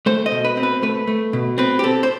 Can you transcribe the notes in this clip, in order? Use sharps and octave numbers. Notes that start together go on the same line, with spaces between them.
A3 C5
D#5
B2
B4
C4
B4
A3 B4
A3
B2
C4 B4
G4
C4 A4
C5